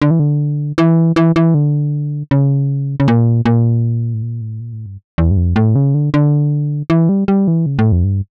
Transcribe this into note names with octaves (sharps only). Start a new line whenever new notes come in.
D3
E3
D3
E3
E3
E3
D3
C#3
C#3
A#2
A#2
A2
A#2
A2
A#2
A2
G2
E2
G2
F2
A2
C#3
D3
D3
E3
G3
G3
E3
C#3
A2
F2
G2